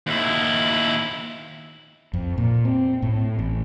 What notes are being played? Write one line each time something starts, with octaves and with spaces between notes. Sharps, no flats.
D#2 E4
F2
A#2
C4
A2
A1